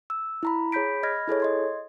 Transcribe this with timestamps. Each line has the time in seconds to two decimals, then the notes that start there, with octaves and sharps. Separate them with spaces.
0.10 E6
0.43 E4 A#5 B5
0.72 G#4 C#5 B5 G6 B6 D7
1.03 D#5 B5 F6 G#6 A#6
1.28 E4 G#4 A4 C#5
1.40 D#5 C6 G#6